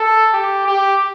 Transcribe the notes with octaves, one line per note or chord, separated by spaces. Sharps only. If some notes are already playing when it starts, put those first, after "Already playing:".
Already playing: A4
G4
G4